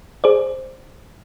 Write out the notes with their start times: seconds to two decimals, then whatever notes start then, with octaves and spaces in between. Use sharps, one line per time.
0.24 G#4 C5 D5